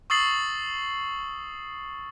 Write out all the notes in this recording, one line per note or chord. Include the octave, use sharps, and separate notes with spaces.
C#6 D#6 E6 A6 C7 F#7